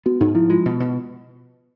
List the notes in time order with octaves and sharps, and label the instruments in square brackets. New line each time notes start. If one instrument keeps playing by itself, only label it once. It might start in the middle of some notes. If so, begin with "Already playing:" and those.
[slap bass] B3 [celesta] F#4
[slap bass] G#2 [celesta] D#4
[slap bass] F3 [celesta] E4
[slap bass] G#3 [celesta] F4
[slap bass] B2
B2